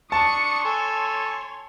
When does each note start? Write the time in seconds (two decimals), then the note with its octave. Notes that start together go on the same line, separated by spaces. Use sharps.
0.12 D4 A5 C#6 D#6 C#7
0.65 A4 C#5 G#5 C6